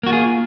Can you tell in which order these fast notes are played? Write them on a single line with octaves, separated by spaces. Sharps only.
A#3 F#4 F4 G#4